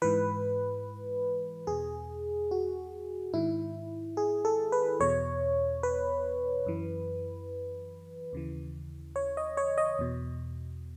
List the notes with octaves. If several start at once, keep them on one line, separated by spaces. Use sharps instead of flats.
G#2 E3 B4
E2 B2 G#4
F#4
G#2 D#3 E4
G#4
A4
B4
E2 B2 C#5
B4
F#2 E3
D#2 C#3 E3
C#5
D#5
C#5
D#5
E2 B2